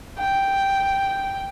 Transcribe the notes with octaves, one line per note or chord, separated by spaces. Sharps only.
G5